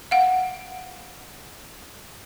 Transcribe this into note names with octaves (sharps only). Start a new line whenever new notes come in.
F5 F#5